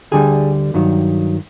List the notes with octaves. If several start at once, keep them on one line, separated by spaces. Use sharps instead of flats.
D2 D3 G3 G#4
G2 D#3 F#3